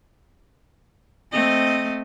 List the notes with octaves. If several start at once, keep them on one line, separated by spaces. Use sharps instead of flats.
A3 C4 D#5